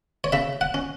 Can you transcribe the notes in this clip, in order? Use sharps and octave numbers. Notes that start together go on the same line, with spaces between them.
C#5
C#3 E5
F#5
C#4